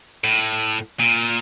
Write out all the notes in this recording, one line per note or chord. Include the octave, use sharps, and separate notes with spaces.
A2
A#2